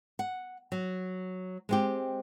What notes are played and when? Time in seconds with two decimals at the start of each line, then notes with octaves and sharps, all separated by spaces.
0.19 F#5
0.72 F#3
1.69 G#3 C4 G4